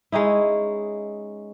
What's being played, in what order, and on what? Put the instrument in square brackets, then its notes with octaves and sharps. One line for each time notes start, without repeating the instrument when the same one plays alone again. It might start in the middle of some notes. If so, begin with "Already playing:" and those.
[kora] G#3 C#4 D#4 E4